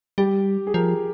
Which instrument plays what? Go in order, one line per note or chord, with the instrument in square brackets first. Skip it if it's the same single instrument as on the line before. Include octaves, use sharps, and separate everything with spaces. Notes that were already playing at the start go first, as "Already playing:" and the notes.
[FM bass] G3 [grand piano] G4
[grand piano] G#4
[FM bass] F3 [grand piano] A#4